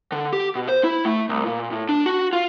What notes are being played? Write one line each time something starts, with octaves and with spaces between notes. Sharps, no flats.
D3
G4
B2
C5
E4
A3
C2
A#2
A2
D4
F#4
F4